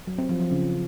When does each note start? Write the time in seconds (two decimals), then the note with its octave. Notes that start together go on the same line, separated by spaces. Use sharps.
0.07 F#3
0.18 C4
0.29 F3
0.40 F3
0.51 C#3